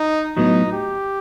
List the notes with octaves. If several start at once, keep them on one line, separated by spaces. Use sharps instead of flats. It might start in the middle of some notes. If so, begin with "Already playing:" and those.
Already playing: D#4
A2 F#3 B3 D#4
G4